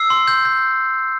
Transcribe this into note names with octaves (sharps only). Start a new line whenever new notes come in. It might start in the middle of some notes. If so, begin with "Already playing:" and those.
Already playing: E6 C7
C6
G6
G6